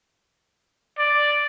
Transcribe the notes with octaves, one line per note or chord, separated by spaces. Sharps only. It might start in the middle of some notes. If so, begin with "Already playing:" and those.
D5